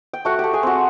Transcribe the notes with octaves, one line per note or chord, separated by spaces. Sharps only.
G5
A3 F#4 F#5
A3 G4 G5
G#4 G#5
C4 F#4 F#5